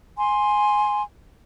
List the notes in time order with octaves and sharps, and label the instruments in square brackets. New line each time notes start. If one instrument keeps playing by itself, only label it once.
[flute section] G#5 C6